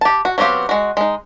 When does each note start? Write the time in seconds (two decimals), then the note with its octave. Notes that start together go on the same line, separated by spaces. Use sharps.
0.01 G4 A5
0.25 F#4
0.38 F#3 B3 C4 G4 F5
0.69 G#3 F#4
0.97 G#3 D#4